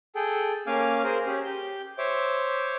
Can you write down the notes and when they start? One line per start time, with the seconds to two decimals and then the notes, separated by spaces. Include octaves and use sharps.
0.15 G#4 A4 G5
0.67 A#3 C#4 F5 G#5 D6 F6
1.04 G#4 A#4 C5
1.26 C#4 G4 G#4
1.45 G4 G6
1.98 C5 C#5 E5 D6